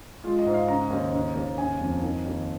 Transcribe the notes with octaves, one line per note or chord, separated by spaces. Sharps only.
G#3 F4
D#5
G#2
F5
C#3 A#5
D#2
C#3
D#2
C#3 G#5
F2
D#3
D#2